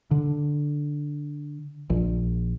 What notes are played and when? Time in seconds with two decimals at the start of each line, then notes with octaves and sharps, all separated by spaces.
0.11 D3
1.90 A#1